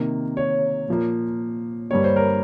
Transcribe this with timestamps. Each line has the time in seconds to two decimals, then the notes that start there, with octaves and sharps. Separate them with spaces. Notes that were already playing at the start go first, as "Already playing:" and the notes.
Already playing: C3 D#3 A#3
0.37 C#5
0.89 A#2 F3 A#3
1.91 G2 G3 A#3 C#5
2.04 C5
2.16 A#4